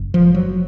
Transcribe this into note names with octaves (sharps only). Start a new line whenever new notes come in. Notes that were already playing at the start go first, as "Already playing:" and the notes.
Already playing: F#1 F#2 C#3
F3
F#3